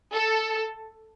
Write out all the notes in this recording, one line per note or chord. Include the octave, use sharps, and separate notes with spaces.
A4